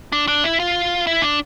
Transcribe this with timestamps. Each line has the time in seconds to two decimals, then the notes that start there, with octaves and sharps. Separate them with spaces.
0.12 D4
0.28 D4
0.44 E4
0.60 F4
1.07 E4
1.22 D4